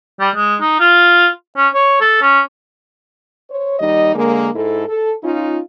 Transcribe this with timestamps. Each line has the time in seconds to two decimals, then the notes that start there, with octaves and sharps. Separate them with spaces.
0.20 G3
0.36 G#3
0.61 D#4
0.80 F4
1.57 C#4
1.74 C#5
2.01 A4
2.22 C#4
3.51 C5 C#5
3.79 D#2 G3 D#4 D#5
4.15 D3 G#3 A#3
4.55 G#2 E4 A4
4.87 A4
5.23 C#4 D#4 F4